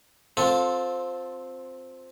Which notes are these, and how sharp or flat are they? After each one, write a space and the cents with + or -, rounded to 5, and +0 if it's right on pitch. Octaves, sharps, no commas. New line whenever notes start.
C4 +0 F4 +20 A4 +0